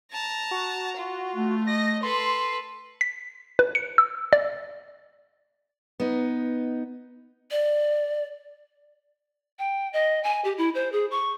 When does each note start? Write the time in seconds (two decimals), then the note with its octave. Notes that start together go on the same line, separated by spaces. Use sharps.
0.12 A5 A#5
0.51 F#4
0.97 F4
1.36 A3
1.67 D#5 A#6
2.03 A4 B4 C6
3.01 B6
3.59 B4
3.75 C#7
3.98 E6
4.33 D5
6.00 B3 D#4
7.51 D5
9.59 G5
9.93 D#5
10.23 G#5
10.44 G4
10.58 E4
10.75 C5
10.92 G#4
11.11 C#6